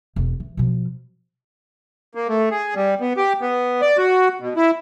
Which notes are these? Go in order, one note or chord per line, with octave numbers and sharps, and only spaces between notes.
E1 C4
E3
B2 F3
A#3
A3
G#4
G3
B3
G4
B3
D5
F#4
B2
E4